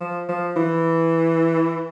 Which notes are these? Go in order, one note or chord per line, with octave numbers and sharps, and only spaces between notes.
F3
F3
E3